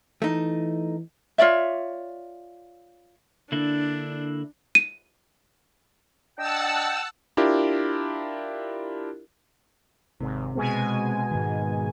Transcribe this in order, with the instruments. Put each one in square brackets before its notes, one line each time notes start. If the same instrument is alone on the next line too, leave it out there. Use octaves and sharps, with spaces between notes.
[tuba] E3 [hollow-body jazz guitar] A3 D#4
[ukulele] F4 C#5 D5 E5
[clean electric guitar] D3 A#3 E4 [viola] D4
[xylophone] D#7
[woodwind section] D4 D#5 G5 [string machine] F#5 A5 E6
[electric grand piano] D4 E4 F4 G4 A#4
[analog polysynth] G#1 [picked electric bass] C3
[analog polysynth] B2 G#3 G#5
[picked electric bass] G#2 D#3